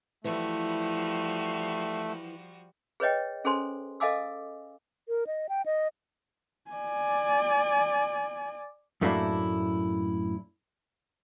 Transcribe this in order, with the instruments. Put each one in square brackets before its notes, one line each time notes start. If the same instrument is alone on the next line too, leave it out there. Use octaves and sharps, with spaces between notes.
[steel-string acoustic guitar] E3 E4 [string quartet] F3 G3 F#4 [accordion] A3
[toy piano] G#4 B4 C#5 D#5 G5
C#4 G#4 A4 C5 G#5 C6
A4 D#5 F5 G#5 D6 E6
[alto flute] A#4
D#5
G5
D#5
[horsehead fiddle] D5 G#5
[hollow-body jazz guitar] F#2 A2 A3 A#3 D4 E4